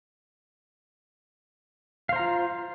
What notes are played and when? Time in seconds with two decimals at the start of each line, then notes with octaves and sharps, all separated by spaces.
2.09 F5
2.13 C5
2.16 A#5
2.19 F4